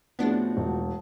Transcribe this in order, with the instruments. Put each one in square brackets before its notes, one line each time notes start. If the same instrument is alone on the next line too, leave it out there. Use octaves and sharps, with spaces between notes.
[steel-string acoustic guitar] A2 F3 F#4 [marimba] A3 C4 G#4 [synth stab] B3 D4
[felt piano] E1